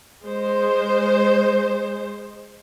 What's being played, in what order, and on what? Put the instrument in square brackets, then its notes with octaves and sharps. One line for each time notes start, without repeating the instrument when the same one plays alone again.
[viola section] G#3 C5